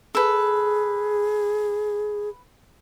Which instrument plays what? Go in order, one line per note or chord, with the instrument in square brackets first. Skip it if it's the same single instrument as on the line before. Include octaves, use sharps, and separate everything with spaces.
[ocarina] G#4 [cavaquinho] A4 B4